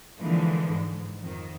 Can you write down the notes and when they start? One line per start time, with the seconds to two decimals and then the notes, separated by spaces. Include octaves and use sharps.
0.19 A#2 D3 E3 F3 G#3
0.73 G#2
1.19 F2 D#3